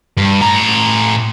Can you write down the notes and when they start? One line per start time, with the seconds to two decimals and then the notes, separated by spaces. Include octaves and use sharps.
0.17 G2
0.41 A2 A#5